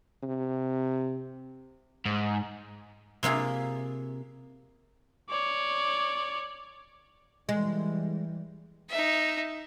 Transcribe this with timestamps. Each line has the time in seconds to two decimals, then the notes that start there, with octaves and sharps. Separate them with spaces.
0.23 C3
2.06 G#2
3.23 C3 A#3 F4 G#4
5.29 C#5 D5
7.49 E3 G3 G#3
8.90 D#4 E5